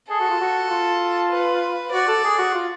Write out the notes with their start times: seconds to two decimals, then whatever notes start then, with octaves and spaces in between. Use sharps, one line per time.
0.10 G#4 A4
0.20 F#4
0.30 F4
0.41 F#4
0.71 F4
1.32 B4
1.92 F#4 D5
2.08 A4
2.24 G#4
2.38 F#4
2.54 F4